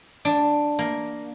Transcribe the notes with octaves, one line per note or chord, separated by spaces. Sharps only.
D4
A#3